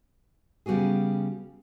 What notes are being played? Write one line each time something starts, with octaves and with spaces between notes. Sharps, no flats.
C#3 G3 B3 F#4 G#4